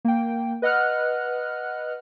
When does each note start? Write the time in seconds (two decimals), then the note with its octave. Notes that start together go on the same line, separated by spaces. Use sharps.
0.05 A#3 G5
0.62 B4 D#5 F#5 F6 F#6